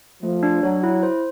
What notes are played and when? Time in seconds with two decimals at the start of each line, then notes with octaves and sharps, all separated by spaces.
0.22 F3 A3
0.43 D4
0.63 F#3 C#5
0.83 E4
1.03 C5